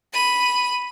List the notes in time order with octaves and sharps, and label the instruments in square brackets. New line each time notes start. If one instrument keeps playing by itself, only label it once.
[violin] B5 D#7